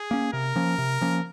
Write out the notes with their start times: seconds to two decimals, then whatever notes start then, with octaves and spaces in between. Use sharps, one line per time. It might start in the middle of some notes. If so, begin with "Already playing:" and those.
Already playing: G#4
0.11 A#3 C#4
0.33 C3 A#4
0.56 F3 A#3 C#4
0.78 C3
1.01 F3 A#3 C#4